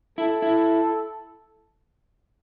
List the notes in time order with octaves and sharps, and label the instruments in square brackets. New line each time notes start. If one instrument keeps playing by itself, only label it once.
[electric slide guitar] E4 [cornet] A4
[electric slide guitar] E4